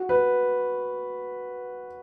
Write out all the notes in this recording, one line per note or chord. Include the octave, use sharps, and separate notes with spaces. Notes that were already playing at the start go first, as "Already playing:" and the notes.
Already playing: F#4
B4